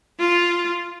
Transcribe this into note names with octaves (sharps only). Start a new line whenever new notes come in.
F4